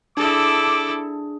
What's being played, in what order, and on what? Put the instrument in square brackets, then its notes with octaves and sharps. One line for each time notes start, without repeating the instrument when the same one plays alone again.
[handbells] D4 G#4 [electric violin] E4 A4 [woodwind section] D6